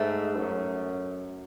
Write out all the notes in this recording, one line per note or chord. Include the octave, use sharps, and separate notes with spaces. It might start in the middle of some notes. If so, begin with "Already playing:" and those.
Already playing: G#2 A3
F#2